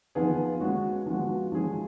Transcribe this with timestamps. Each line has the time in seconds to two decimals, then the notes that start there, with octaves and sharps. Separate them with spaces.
0.15 F3 B3 D#4 G#4
0.60 G#3 C#4 F#4
1.06 F3 G#3 B3 F#4
1.52 F3 G#3 C#4 G#4